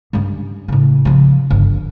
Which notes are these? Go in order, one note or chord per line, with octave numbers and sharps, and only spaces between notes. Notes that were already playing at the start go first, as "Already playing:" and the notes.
G2 C#4
A2 C#3
C#3 F3
G1